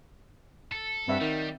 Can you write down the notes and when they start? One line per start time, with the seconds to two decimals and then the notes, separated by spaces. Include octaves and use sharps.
0.72 A4
1.08 G2 C4 E5 F#5
1.21 D#3 G3